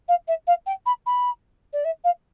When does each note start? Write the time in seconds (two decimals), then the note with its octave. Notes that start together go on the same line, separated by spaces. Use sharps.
0.08 F5
0.28 E5
0.47 F5
0.66 G5
0.86 B5
1.06 B5
1.73 D5
1.85 E5
2.04 F5